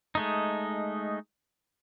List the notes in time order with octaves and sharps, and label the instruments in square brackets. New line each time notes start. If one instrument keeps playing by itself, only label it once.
[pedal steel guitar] G#3 A3 D#4